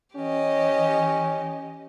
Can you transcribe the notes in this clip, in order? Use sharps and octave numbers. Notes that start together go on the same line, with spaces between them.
E3 C#4 G4 D#5